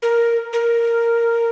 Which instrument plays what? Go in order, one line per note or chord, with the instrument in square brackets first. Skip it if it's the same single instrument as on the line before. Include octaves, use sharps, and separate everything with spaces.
[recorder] A#4
A#4